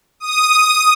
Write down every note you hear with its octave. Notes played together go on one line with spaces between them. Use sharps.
D#6